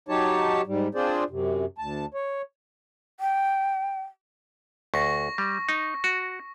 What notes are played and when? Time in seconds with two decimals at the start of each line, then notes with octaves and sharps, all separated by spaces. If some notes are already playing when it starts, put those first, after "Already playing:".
0.09 F#3 D#4 G4 C#5 A5
0.67 G#2 G3
0.95 C4 D4 F4 G#4 C5 D5
1.30 F#2 C3
1.78 D2 A5
2.14 C#5
3.20 G5
4.94 D2 C#6 A#6
5.38 G3
5.69 D#4
6.04 F#4